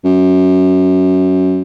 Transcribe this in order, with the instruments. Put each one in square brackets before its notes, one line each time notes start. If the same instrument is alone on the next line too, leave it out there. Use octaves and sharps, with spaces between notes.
[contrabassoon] F#2